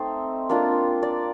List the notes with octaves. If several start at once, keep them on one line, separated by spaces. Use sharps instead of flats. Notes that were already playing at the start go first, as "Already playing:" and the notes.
Already playing: A3 C4 D#4 C5
A#3 D4 F4
D5